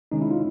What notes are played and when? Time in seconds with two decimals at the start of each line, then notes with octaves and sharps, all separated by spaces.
0.12 C3 D#3 G#3 C#4 D#4
0.22 E4
0.31 F4